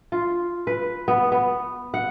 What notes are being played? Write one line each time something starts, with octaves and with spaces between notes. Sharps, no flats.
F4
B4
B3
B3
F#5